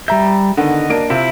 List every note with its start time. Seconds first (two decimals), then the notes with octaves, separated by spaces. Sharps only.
0.08 G3 E5 A#5 G6
0.57 D3 D#3 B3 D#5
0.90 A#3 D4 D7
1.10 C3 E4 F4